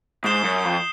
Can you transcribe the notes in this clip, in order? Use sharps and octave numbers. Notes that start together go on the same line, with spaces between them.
G#2 D#6 G6 C7 E7 G7
F#2
F2